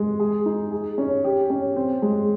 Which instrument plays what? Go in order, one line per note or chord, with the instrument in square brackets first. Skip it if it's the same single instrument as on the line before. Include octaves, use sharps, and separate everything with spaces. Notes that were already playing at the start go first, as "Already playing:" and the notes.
Already playing: [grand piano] G#3
G#4
D#4
G#4
C#4
G4
C#4
C4
G#3